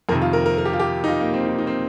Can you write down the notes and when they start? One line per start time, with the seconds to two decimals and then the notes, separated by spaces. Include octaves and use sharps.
0.09 F2 C3 D#3 A#4
0.22 F4
0.33 A#4
0.46 A#4
0.58 A#4
0.65 G4
0.73 F4
0.79 G4
1.04 D#4
1.08 F4
1.21 A#3
1.34 C4
1.46 D#4
1.58 D#4
1.67 C4